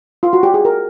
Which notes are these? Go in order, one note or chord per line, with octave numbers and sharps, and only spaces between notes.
F4
F#4
G4
G#4
A#4